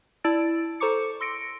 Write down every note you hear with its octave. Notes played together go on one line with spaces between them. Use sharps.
E4 D5 A5 E6 A6 D7
A4 C5 A#5 C#6 D6 C#7
C6 E6 A#6 C#7 D7